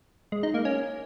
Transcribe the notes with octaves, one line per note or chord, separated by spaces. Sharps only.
G#3
D#4
A#3
C#4